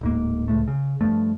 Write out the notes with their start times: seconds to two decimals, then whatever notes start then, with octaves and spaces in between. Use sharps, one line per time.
0.01 D1 G#2 A#3
0.48 C#2 A2 A3
0.68 C#3
1.01 G2 F3 A3